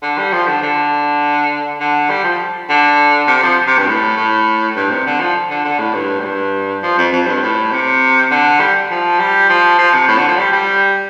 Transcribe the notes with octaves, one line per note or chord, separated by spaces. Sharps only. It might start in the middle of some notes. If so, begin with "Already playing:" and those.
D3
G3
F3
D3
D3
D3
G3
F3
D3
C3
F3
C3
G2
A2
A2
G2
C3
D3
F3
D3
D3
A2
G2
A2
G2
F3
F2
F2
G2
A2
C3
D3
G3
F3
G3
F3
F3
C3
A2
D3
F3
G3
G3